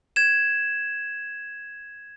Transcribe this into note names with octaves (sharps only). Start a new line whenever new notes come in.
G#6 E7